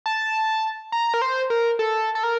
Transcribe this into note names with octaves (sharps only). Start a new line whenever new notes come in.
A5
A#5
A#4
C5
A#4
A4
A4
A#4